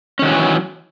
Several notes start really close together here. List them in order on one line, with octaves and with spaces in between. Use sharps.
C#4 D#3 F#3 E3